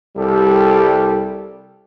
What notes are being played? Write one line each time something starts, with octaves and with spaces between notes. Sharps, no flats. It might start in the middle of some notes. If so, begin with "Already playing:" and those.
C2 G3 G4 A4